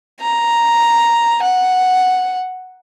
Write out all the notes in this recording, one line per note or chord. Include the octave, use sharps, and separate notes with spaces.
A#5
F#5